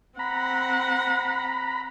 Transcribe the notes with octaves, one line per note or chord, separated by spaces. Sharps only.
C4 F#5 A#5 B5